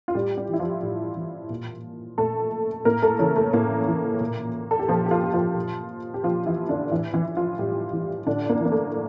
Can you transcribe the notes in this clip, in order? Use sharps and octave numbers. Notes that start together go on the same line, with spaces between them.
F4
A2 G3 G4
G3 G4
E3 E4
F3 F4
A2
E3
A#2
A#2 A3 A4
A2 A#3 A#4
A3 A4
C#3 E3 C#4
A3
A2 A#3
E3
A#2
A4
G4
A#2 F3 F4
G4
F3 F4
G4
F3 F4
A#2
G4
A#2 F3 F4
E3 E4
D3 D4
A2 E3 E4
E3 E4
E3
F3 F4
A2 G3 G4
E3
A2 D3 D4
A#3
E3 A#3
A3